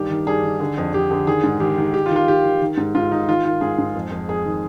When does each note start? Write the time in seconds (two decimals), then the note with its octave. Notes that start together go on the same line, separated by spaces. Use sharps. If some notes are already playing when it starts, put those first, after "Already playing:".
Already playing: G2 D#3 G4
0.10 D#3
0.27 G2 G#4
0.43 D#3
0.60 D3
0.77 F2
0.93 F2 G4
1.11 D3
1.27 D#3 G#4
1.43 G#2
1.60 D#3 G4
1.78 D#3
1.94 D#3 G4
2.06 F4
2.10 D#3
2.16 F4
2.28 D#3 G4
2.45 D#3
2.62 D#3
2.77 G#2
2.95 G#2 F4
3.11 D#3 D#4
3.28 D#3 F4
3.45 D#3 F4
3.61 G#2 G#4
3.78 G#2
3.95 F2
4.11 F2
4.28 F2 G#4
4.45 D#3